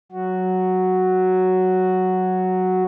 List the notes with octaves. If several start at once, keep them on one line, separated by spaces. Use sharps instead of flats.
F#3 F#4